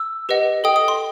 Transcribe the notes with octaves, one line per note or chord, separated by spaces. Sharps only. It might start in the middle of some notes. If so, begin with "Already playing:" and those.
Already playing: E6
G4 B4 D#5 F#5
A4 D#5 G5 D#6
D#6
C6